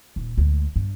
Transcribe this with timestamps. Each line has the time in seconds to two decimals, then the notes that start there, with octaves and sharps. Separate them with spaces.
0.16 D#1
0.38 D2 G#3
0.76 G2